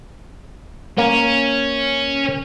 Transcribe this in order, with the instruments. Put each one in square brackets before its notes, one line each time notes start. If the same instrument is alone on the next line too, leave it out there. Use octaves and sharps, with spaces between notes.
[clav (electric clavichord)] A#3 [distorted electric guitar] C#4